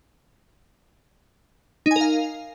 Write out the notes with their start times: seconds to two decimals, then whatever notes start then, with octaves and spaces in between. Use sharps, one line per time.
1.86 D#4
1.91 G#5
1.96 A#4
2.01 F5